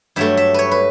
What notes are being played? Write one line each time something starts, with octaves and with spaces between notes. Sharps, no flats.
G2 F#3 A3 E5
E5
B4 C#5
B4